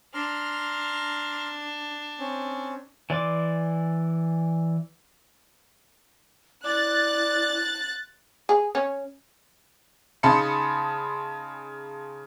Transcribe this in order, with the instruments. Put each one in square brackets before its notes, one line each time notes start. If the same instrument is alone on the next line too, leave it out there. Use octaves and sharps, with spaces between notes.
[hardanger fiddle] D4 [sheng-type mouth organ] A#5 C6 F6
[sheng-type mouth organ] C4 C#4
[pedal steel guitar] E3 D5 C6 D6
[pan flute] E4 [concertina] D5 [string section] F#6 A6
[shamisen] G#4
C#4
[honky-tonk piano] C#3 D#4 A5 B5 C6 C#7